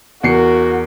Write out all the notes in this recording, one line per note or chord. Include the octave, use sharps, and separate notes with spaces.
E2 F#4 A#4 C7 C#7